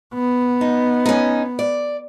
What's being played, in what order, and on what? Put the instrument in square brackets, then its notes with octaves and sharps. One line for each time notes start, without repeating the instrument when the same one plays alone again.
[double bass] B3
[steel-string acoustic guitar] D#4
C#4 D#4
D5